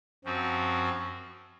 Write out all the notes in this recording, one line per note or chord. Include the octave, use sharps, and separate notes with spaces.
F#2 F3 C4 F#4